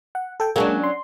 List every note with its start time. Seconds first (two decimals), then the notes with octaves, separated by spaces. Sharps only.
0.15 F#5
0.40 A4 G5
0.56 F#3 G#3 A#3 C#4 D4
0.84 C6